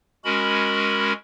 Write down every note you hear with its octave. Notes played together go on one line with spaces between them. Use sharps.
G#3 C#4 F#4 A#4 B5